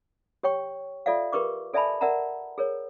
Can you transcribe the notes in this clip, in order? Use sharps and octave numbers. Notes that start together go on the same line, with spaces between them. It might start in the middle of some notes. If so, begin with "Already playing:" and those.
G4 C#5 G5 C#6
F4 A4 D5 E5 F5
G4 A#4 B4 C#6 D6
A4 D5 E5 G#5 A5 B5
A#4 D5 E5 F#5 A5 A#5
G#4 A#4 C#5